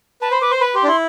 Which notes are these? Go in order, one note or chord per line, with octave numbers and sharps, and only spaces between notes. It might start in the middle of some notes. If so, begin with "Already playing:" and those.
B4 A5
C5 B5
B4 D6
C5 C6
B4 B5
G4 C6
D4
E4 C6